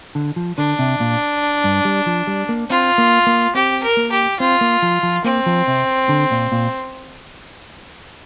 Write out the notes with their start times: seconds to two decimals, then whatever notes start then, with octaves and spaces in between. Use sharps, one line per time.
0.15 D3
0.36 F3
0.58 D3 D4
0.79 C3
1.00 A#2
1.64 G2
1.85 G3
2.06 F3
2.27 G3
2.49 A#3
2.70 C4 F4
2.98 A#3
3.27 A#3
3.55 C4 G4
3.83 A#4
3.97 A#3
4.11 G4
4.39 C4 F4
4.61 A#3
4.82 F3
5.03 F3
5.24 A#3 C4
5.46 F3
5.67 C3
6.09 D3
6.31 A#2
6.52 A#2